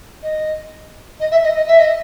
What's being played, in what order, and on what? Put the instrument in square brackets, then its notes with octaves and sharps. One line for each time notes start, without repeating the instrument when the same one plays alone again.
[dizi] D#5
D#5
E5
D#5
D#5
E5
D#5